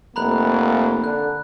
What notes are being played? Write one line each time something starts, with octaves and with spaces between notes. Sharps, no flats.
F1 A#3 A#5 B5 F#6
D3 F#6